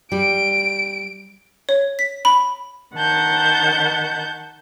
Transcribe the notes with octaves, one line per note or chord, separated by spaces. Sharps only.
G3 D7
C#5
B6
B5
D#3 F#5 A5 G6